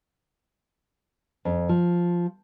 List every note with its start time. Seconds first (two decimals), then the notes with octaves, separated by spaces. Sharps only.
1.45 F2
1.69 F3